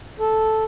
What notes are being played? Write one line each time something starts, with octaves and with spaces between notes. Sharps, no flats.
A4